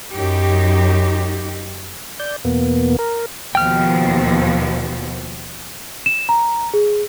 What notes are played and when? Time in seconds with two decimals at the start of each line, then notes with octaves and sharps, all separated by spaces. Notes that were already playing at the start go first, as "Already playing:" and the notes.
0.14 F#2 D#4 G4
2.20 D5 G6
2.45 E2 B2 A#3 B3
2.99 A#4
3.55 D#2 B2 F3 G5 F6
6.06 E7
6.29 A#5
6.74 G#4